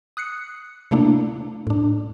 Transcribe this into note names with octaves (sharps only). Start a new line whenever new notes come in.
D#6 F#6 C7 C#7
C3 A3 A#3 D4 E4
A2 D4